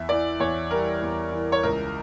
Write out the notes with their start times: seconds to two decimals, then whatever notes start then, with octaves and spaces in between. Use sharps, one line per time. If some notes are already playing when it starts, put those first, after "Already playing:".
Already playing: E2 E5
0.09 E3 D5
0.40 E2 C#5
0.71 G3 A#4
1.02 E2
1.33 E3
1.52 C#5
1.63 C#2 A#4